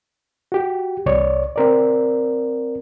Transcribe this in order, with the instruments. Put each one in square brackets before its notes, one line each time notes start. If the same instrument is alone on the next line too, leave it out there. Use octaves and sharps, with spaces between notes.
[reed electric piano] F#4 G4
C2 C#5 D5
C4 A#4 D5